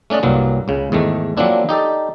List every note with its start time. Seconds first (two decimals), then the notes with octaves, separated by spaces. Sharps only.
0.10 A3 C#4 D4 D5 D#5
0.23 C2 G2 F#3 A#3
0.68 C#2 C#3
0.92 E2 G#2 D#3 A3
1.37 F3 F#3 A#3 C4 D4 E4
1.69 D#4 G4 A4 D5